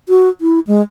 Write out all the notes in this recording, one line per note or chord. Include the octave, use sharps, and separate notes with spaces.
F#4
E4
G#3